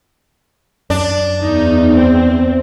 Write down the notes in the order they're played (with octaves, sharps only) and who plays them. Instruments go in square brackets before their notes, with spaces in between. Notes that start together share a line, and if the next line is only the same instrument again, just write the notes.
[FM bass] F#2 [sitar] D4
[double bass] E2 [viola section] D#4
[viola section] C4